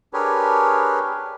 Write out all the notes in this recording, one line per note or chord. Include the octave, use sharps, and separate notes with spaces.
D4 G4 G#4 A#4 B4 C#5